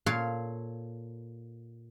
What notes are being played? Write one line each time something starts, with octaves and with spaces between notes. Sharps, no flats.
A#2 A4 C#5 F5